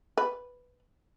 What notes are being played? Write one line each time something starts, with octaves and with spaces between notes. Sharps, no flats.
B4